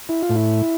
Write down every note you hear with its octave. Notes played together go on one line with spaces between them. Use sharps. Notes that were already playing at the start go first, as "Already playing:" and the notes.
E4
F4
A2
E4